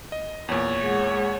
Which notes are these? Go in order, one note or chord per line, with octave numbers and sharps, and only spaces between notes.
D#5
E2 A#2 C#5
G#3 G#4 F#5